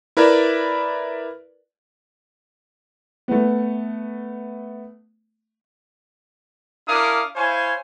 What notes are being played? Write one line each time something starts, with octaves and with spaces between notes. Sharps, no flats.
E4 A#4 B4 D5 E5
A3 B3
D4 E4 A#4 F5 D6 D#6
E4 C5 C#5 F5 G#5